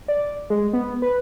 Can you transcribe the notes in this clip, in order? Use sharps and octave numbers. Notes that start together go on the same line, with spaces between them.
D5
G#3
B3
B4